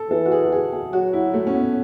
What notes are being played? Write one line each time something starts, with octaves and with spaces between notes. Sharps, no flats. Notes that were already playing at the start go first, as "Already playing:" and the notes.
Already playing: A4
E3 A4
F#4
G#4
F#4
G#4
G#4
F#3 F#4
E4
A3
C#4
B3